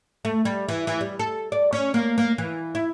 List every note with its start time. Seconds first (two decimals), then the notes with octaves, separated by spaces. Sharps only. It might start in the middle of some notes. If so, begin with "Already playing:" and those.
0.25 A3
0.45 G3
0.69 E3
0.87 E3
1.01 G3
1.19 A4
1.52 D5
1.73 C#4
1.94 A#3
2.18 A#3
2.38 E3
2.75 E4